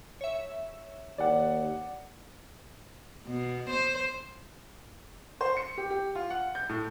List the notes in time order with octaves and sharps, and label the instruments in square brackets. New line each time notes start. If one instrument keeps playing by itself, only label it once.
[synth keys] C#5 E5
[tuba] D#2 [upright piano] D5 F#5
[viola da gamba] B2
C5
[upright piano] C5
C#7
G4
G4
F4
F#5
G6
A2